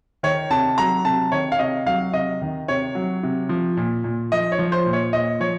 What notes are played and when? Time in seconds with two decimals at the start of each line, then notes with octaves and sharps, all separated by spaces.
0.23 D#3 C#5
0.51 C3 A5
0.78 F#3 A#5
1.05 C3 A5
1.32 D#3 C#5
1.52 F5
1.59 C3 D#5
1.86 F#3 F5
2.13 C3 D#5
2.42 D#3
2.68 C3 C#5
2.95 F#3
3.23 C3
3.49 F3
3.77 A#2
4.04 A#2
4.32 F3 D#5
4.52 C#5
4.59 F3
4.72 C5
4.86 A#2
4.93 C#5
5.13 A#2 D#5
5.40 F3 C#5